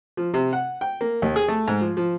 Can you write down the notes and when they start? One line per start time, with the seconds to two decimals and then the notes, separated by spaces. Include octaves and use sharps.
0.17 F3
0.34 C3
0.53 F#5
0.81 G5
1.01 A#3
1.22 D#2
1.36 G#4
1.48 A3
1.68 G#2
1.81 F3
1.97 F3